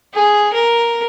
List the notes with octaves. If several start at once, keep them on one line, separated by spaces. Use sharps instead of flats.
G#4
A#4